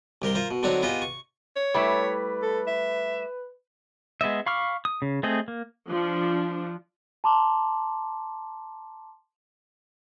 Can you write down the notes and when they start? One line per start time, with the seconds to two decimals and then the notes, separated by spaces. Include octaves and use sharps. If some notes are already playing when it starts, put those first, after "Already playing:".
0.22 C2 G4 A#4 C6
0.35 F4 A#4 C5
0.51 B2
0.63 D3 F#3 C4 D4 D#4 C#5
0.82 B3 F4 G4 G#4 D#5
1.02 C#6
1.56 C#5
1.74 G3 A3 E4 B4
2.42 A4
2.67 E5
4.21 G#3 B3 D#5 E5
4.46 F5 B5 C#6 D6 F6
4.85 D#6
5.02 C#3
5.23 A3 C4 G#4 D#5
5.48 A#3
5.89 F3 D4
7.24 A5 A#5 C6 D6